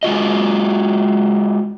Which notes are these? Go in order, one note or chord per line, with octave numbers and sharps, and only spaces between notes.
G#3 F4 F#4 D#5